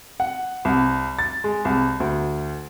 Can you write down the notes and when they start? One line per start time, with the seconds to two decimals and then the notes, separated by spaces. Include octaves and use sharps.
0.20 F#5
0.65 C2
1.19 A6
1.44 G#3
1.65 C2
2.00 D2